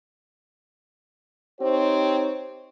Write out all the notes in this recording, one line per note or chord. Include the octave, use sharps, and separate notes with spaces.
C4 D#4 G4 C5 C#5